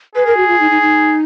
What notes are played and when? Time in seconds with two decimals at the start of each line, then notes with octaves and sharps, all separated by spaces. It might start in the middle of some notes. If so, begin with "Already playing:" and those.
0.15 G#4 B4
0.26 A#4
0.37 F#4
0.48 F4
0.60 D#4
0.71 D#4
0.82 D#4